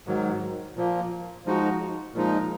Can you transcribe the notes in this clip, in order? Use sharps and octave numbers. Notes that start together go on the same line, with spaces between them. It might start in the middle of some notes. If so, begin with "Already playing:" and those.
G#2 D#3 F#3
A#2 F3 A#3
F3 G#3 D#4 F#4
A#2 F3 G#3 D#4